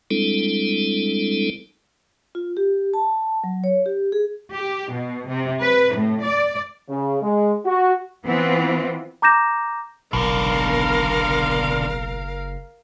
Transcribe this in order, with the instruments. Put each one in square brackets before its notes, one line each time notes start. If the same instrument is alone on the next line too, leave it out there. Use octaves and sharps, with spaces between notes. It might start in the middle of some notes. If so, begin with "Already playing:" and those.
[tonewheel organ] G3 G#3 C4 D4 E4 A4
[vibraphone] F4
G4
A5
F#3
C#5
G4
G#4
[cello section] G4
B2
C3
B4
A2
D5
[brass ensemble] C#3
G#3
F#4
[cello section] E3 B3 C4 F4
[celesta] A#5 D6 G6 A#6 E7
[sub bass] F#1 [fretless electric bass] B1 [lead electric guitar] B2 D3 [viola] A#4 F5